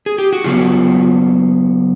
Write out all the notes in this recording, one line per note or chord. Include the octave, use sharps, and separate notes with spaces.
G#4
G4
F#4
C#3 F#3 B3 F4